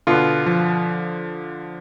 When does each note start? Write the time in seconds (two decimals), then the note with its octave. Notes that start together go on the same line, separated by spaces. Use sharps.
0.07 B2 D3 B3 F4
0.46 F3